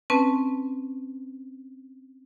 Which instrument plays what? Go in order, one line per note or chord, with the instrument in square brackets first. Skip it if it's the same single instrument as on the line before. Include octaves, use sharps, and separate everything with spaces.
[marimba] C4 C#4 B4 A5